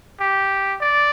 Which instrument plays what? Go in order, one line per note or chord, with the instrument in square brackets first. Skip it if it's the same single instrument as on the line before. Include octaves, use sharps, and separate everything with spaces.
[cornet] G4
D5